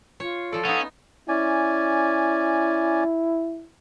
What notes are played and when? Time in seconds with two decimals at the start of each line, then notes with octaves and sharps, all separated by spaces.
0.20 F4 C#5
0.52 F3 A4 D5
0.65 B3 C#4 D#4 F5 F#5 D#6
1.28 C#4 E4 D5 G#5